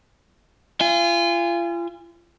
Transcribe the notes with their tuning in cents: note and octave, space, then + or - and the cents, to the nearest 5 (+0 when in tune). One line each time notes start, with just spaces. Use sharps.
F4 -35 G#5 -25